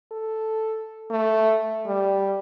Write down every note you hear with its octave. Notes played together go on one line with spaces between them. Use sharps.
A4
A3
G3